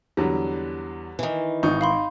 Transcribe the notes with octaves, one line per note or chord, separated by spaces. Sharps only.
E2 D3 F#3 G3
D#3 E3
G#1 D#4 C#6 G6
F5 B5 C6